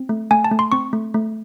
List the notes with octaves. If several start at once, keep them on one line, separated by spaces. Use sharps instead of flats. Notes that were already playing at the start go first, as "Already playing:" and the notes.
Already playing: C4
A3
A3 G#5
A5
A3
C6
C4 C#6
A3
A3